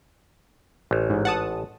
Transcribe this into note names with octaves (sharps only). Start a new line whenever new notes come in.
A1
G#2
F#5 A5 D#6